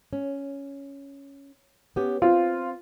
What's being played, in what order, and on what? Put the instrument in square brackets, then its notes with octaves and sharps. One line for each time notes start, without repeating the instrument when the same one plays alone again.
[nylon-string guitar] C#4
B3 C#4 G4
[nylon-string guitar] C4 [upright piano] F4